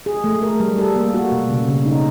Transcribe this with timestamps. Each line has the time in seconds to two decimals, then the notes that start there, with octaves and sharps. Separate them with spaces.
0.06 G#4
0.24 A3
0.42 A#4
0.60 G3
0.78 A4
0.96 A#3
1.14 F#4
1.32 B2
1.50 C#3
1.68 C#3
1.86 D#4